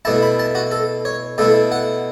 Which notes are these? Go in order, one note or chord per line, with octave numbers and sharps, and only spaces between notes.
B2 A3 E4 A5
B5
A5
F#4
A4
C#5
B2 A3 E4 A4
F#5